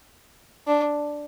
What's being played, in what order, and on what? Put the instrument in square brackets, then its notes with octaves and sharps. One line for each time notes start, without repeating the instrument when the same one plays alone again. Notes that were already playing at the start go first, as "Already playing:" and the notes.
[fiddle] D4